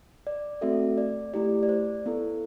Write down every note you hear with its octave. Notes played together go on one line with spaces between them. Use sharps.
D5
A3 C4 F#4 A4 E5
D5
A3 E4 G4 D5
D5
C5
B3 E4 A4